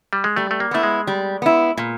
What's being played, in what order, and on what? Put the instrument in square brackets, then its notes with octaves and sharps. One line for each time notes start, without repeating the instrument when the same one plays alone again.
[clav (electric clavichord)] G3
G#3
[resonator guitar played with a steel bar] G3 [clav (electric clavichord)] A3
[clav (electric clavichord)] A3
A#3
[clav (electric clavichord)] A3 [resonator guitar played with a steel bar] B3 E4
[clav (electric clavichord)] G#3
[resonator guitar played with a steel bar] G3
B3 E4
A#2